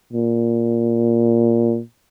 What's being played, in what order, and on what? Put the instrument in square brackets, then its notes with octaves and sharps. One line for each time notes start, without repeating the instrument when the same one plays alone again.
[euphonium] A#2